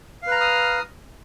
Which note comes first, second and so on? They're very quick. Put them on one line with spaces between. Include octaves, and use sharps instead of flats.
F5 B4 A#5 F6 D#6